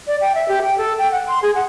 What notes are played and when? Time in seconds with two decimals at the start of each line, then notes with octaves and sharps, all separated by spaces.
0.07 D5
0.21 G5
0.35 E5
0.49 G4
0.62 G5
0.78 A4
0.98 G5
1.12 F#5
1.28 C6
1.43 G#4
1.55 F#5